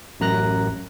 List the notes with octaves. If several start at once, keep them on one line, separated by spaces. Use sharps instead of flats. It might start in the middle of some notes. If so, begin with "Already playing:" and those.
A1 F#2 A#5 F#6 A#6